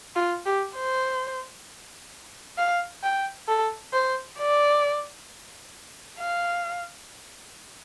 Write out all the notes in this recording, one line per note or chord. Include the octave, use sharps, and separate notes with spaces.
F4
G4
C5
F5
G5
A4
C5
D5
F5